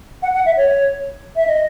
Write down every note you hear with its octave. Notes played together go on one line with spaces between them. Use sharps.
F#5
F#5
E5
C#5
E5
D#5